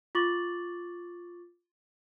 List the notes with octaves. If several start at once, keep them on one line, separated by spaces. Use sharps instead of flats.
F4 C#6 D6 A6 F#7